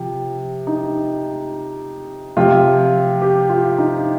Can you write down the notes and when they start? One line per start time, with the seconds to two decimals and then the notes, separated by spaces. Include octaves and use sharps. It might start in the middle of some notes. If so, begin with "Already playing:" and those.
Already playing: C3 F3
0.67 D#4
2.37 C3 F3 F4
3.22 G4
3.49 F4
3.78 D#4